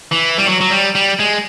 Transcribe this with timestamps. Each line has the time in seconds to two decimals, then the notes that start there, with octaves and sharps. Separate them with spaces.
0.12 E3
0.38 G3
0.46 F#3
0.61 F#3
0.71 G3
0.95 G3
1.19 G#3